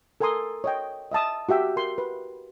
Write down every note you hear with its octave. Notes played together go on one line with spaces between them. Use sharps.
A4 A#4 G#5 A#5 C6 D#6
C#5 D#5 G5
D#5 E5 A5 D#6
F#4 G4 E5 G5
A#4 C6
B4